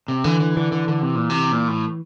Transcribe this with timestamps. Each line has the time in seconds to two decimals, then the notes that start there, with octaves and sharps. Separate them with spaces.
0.08 C3
0.24 D3 E3
0.40 E3
0.56 D3 E3
0.72 D3
0.88 D3
1.02 C3
1.15 A#2
1.30 C3
1.52 A#2
1.68 A2